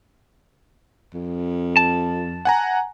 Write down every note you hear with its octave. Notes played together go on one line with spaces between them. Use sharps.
F2
A5
F#5 G#5 A#5